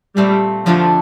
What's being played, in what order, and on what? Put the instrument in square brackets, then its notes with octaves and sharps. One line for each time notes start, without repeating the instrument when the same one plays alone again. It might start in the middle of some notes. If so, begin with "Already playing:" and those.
[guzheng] A#2 A3 C4 [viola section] G3
[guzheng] F2 D3 A3 D4 A4 [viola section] F3